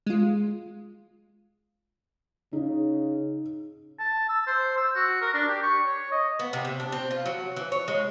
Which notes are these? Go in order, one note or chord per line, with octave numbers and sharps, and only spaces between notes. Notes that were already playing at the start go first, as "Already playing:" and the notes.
G#3 F4
C#3 D#4
A5
E6
C5
E6
F#4
A#4
D4
G4
C#6
C#5
D#5
B3
C3
C3
D4
C4
F4
F#3
E3
C#5
G#3